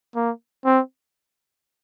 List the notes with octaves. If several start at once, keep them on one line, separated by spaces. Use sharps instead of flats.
A#3
C4